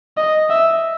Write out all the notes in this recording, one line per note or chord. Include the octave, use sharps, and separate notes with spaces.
D#5
E5